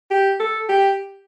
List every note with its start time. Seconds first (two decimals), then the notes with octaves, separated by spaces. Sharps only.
0.11 G4
0.40 A4
0.69 G4